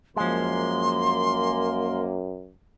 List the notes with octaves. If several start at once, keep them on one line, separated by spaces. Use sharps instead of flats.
F#2 F3 G#3 A#3 C6